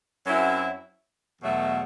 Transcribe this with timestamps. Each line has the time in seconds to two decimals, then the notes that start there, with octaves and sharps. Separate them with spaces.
0.26 F#2 F#3 C4 E4
1.40 E2 B2 F#3 A3